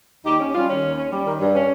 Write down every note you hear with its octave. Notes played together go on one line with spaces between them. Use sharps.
D#2 D#4 G4
C#4
G3 C#4 F4
D#3 C#4
D#2
C#4
G3
D#3
G2
C#4